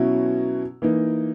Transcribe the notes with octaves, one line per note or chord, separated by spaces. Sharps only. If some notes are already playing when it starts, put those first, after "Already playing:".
Already playing: B2 F#3 C#4 E4
E3 A#3 D#4